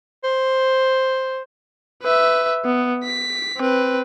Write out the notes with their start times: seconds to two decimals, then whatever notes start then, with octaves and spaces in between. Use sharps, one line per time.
0.24 C5
2.02 B4 E5
2.65 B3
3.04 B6
3.57 C4 B4